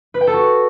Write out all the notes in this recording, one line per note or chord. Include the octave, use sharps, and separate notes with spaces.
B4
G5
A4
F#4